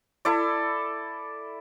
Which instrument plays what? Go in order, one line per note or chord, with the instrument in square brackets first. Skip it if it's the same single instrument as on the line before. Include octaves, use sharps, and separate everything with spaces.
[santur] E4 A4 D5